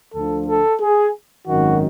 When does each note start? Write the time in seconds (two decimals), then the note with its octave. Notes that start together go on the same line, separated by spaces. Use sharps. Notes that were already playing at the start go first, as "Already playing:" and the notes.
0.14 D2 D3 F3 A4
0.47 A4
0.80 G#4
1.47 G#1 F#2 D#3 F#4